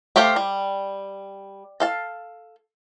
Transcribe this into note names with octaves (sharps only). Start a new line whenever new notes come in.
A3 G4 A4 C5 F5
G3
A4 F5 A5